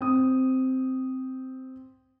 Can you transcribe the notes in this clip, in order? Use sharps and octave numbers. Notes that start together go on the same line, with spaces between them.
C4 D#6